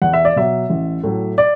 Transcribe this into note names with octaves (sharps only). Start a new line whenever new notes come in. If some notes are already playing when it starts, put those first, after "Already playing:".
E2 F#5
E5
D5
B2 F#3 E5
A1
A2 F#3
D5